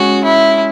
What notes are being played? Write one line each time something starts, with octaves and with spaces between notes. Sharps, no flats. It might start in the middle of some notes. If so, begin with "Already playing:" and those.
Already playing: G#3 C#4 F#4
E4